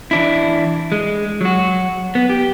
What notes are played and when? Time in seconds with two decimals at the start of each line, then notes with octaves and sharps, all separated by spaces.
0.11 E3 D4 E4
0.92 G#3
1.41 F#3 F#4
2.15 B3
2.29 G4